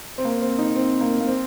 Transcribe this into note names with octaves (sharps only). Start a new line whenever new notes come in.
C4
A#3
C4
D#4
C4
A#3
A#3
C4